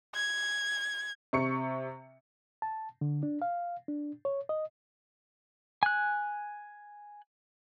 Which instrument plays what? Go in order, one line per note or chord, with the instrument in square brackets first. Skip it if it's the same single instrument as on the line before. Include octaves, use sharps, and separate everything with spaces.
[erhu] G#6
[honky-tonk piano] C3 C#6 C#7
[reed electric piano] A5
D3
D4
F5
D4
C#5
D#5
[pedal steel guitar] G#5 F#6